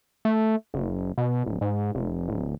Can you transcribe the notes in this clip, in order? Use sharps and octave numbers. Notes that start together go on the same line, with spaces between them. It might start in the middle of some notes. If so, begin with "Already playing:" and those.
A3
F#1
B2
D1
G#2
F1
D1